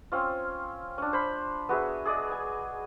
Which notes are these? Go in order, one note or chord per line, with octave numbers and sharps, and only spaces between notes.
C4 C#4 F4
C#4 D4
C5 B5
B3 F#4 G#4 E5
G#4 D5 D#5
G#5